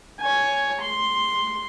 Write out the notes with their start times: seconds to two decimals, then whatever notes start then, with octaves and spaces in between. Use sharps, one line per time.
0.20 C#5 G#5
0.82 C6